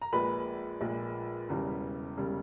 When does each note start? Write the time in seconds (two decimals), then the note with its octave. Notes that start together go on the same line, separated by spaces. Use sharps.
0.02 A#5
0.13 A#1 A#2 G#3 B4 B5
0.81 A#1 A#2 G#3
1.49 E1 E2 C#3 G3
2.17 E1 C#3 G3